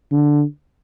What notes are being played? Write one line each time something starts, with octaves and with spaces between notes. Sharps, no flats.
D3